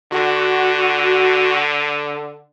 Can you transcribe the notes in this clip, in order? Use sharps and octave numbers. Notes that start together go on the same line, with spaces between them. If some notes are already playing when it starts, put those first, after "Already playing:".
D3 F#4